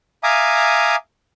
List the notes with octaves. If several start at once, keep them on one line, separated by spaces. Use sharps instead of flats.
E5 F5 G#5 A#5 D6 D#6